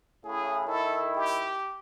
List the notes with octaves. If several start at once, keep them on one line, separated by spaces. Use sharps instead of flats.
A2 C#3 E4 G#4
D#3 E4 A4
G4